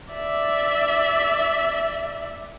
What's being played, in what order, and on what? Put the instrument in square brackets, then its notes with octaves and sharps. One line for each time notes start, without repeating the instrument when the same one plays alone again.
[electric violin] D5 E5